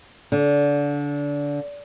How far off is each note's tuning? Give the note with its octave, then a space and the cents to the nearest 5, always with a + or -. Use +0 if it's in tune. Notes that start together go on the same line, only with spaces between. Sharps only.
D3 -25